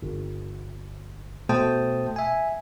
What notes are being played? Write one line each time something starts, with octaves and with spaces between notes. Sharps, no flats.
G1
B2 A3 C5 G5 A5 D#6
E5 G#5